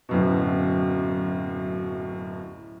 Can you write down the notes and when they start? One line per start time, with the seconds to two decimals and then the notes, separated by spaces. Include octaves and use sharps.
0.09 D1 F#2 B2